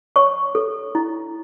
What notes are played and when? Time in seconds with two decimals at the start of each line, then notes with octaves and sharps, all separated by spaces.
0.16 C#5 C#6
0.55 A4
0.95 E4